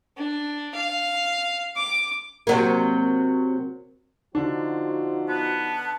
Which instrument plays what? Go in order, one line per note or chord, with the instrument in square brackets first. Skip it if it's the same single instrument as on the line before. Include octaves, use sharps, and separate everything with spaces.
[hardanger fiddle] D4
F5
D6
[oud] C3 F#3 A#3
[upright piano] D3 D4 [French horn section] F3 D#4 F#4
[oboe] B3 [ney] A5